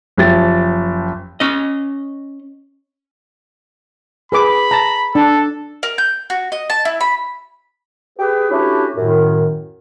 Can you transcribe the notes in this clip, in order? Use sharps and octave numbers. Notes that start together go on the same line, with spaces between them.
F#1 F3 G4 A6
C#4 D#5
G#4 B4 B5 D6
A5 A#5
D4 A4
A#4
G6
F#4
D#5
A5
E4
B5
G4 G#4 B4
A3 C#4 D4 E4 F#4 G4
F#2 A2 D#3